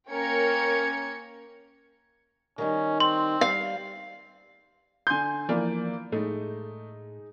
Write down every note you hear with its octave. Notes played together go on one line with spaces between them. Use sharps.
A#3 C#4 A#4 G5 G#6 C#7
D#3 G3 C#4 D#4
C4 C6
G3 F5
D3 G#5 C6 G6
E3 F3 A#3 D5
A2 G#3 A3 D#4